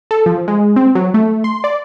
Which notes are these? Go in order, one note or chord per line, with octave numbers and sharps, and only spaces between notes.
A4
F3
G#3
C4
F#3
A3
C6
D5